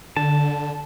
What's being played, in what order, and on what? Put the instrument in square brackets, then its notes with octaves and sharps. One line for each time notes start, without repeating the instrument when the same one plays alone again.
[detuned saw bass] D3 [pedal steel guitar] A5